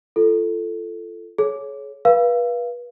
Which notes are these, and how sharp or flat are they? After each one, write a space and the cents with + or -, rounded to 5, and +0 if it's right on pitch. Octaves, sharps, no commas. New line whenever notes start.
F4 -25 A4 +0
G#4 +40 C#5 +0
B4 -30 F5 -20